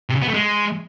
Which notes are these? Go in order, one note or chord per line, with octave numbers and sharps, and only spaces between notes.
C3
C#3
B3
A3
G#3